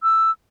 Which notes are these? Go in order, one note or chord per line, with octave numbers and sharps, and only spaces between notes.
E6